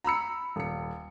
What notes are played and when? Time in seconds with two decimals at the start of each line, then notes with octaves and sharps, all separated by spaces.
0.04 A#5 B5 E6 C#7
0.56 D#1 C#7